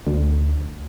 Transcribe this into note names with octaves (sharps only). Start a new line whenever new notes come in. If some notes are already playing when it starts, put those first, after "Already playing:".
D2